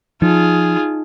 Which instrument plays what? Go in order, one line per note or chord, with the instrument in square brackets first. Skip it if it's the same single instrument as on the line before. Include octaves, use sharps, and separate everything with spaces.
[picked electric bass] F3 [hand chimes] D#4 [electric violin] F4 G#4